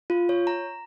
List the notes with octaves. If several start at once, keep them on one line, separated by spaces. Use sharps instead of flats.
F4
C#5
A#5